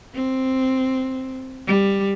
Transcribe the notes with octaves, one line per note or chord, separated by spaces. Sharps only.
C4
G3